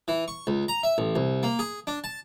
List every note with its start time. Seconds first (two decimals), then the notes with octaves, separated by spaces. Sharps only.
0.08 E3
0.28 C#6
0.47 C#2
0.68 A#5
0.83 E5
0.98 A1
1.16 C2
1.43 A#3
1.59 G#4
1.87 D4
2.04 A5